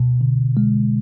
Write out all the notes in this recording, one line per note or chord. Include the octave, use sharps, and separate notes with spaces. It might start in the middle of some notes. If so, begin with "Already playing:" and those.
Already playing: B2
D3
G#3